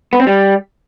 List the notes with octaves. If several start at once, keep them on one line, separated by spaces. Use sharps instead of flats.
B3
C4
G3